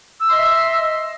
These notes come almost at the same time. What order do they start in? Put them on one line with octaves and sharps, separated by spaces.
E6 C6 D#5 E5